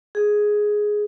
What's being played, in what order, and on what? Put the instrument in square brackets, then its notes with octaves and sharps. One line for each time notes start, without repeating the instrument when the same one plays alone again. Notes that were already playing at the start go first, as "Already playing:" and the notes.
[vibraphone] G#4